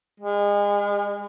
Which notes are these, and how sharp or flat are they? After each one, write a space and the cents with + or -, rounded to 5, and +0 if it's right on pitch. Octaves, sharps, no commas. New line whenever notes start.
G#3 -35